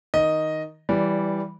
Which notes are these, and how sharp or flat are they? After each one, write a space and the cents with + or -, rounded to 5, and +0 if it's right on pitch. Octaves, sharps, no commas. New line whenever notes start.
D#3 +5 D#5 +0
E3 +0 G3 +0 D5 -20